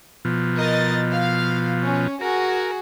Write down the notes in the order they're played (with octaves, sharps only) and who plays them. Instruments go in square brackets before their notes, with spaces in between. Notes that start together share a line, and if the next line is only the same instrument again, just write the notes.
[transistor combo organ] B2 F3
[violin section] A#4 D#5 A6
F5
C#4
[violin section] F#4 G#4 [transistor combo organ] A#4